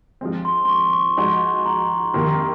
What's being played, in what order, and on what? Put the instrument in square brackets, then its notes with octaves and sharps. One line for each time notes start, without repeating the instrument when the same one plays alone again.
[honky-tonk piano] F3 G#3 C4
[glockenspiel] C6
C6
C#6
C#6
[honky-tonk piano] F3 G#3 D#4 F#4 [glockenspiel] C6
[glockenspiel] A#5
[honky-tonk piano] F2 C3 D#3 A#3 [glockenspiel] C6